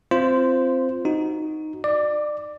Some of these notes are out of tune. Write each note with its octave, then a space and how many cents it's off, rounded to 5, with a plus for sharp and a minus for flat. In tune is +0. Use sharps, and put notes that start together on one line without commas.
C4 +0 F4 -20 C5 -5
D#4 +0 F#4 +0
D5 +25 D6 +0